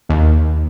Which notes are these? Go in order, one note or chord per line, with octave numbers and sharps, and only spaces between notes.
D#2